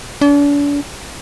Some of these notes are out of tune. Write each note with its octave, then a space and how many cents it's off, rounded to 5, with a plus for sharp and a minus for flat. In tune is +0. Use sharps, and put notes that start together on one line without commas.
D4 -40